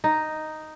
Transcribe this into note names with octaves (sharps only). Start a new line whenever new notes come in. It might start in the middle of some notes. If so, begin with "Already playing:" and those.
D#4